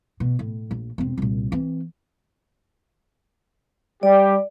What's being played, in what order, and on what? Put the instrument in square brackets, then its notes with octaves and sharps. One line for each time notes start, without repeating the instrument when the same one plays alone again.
[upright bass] B2
A2
A#1
E1 C4
C2 A#2
E3 C4
[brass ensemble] G3 G4 [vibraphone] D5